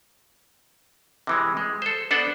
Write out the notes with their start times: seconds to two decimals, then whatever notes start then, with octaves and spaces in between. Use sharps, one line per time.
1.27 C3 E3 G#3
1.57 G#3
1.82 A4 C5
2.11 B3 D4 A4 C5 F#5